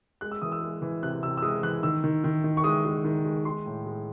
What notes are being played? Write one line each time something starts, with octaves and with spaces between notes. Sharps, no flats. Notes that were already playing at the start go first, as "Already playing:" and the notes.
G#3 F#6
E6
E3 D#6
E6
G#3
E3
C3 F#6
C3 E6
E6
G#3 D#6
E3 F#6
D#3 E6
D#3
D#3
D#3
C#6
G#3 D#6
G#3
D#3
G#3
G#3 C6
A2
G#3